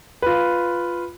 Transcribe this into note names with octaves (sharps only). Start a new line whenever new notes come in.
F4 B4